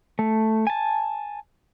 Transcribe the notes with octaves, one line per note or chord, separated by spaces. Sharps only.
A3
G#5 A5